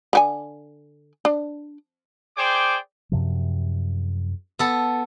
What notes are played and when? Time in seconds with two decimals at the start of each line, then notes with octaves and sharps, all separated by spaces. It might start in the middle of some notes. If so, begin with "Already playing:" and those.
0.13 D3 F#4 G#5
1.25 D4
2.37 G#4 C5 D5 G5 D6
3.12 F#2 C3 F3
4.59 B3 A4